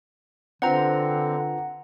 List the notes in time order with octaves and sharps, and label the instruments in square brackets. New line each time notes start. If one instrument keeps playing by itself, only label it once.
[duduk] D3 [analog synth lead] C4 [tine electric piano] D4 F4 B4 [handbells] F#5 A#5